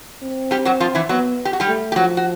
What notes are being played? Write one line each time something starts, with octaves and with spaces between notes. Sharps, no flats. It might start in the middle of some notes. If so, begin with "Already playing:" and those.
C4
G3 G4
F#3 F#4
F3 F4
E3 E4
F#3 B3 F#4
G4
F#4
G3 G4
A3
G4
F3 F#3 F#4
F#4